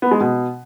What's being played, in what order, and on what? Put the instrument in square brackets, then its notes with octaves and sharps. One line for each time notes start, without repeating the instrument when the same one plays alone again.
[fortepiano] B3
G#3
B2